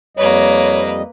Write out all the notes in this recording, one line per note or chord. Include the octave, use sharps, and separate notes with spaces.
F2 G3 A#3 B4 C#5 D#5